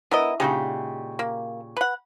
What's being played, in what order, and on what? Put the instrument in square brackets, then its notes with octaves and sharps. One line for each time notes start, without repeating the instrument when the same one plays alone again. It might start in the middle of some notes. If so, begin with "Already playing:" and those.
[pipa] B3 A#4 D#5 [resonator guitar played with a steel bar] E4
[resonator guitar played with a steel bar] A#2 C#3 G4 [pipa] G#3 D#4 F#4
[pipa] A#3
B4 F#5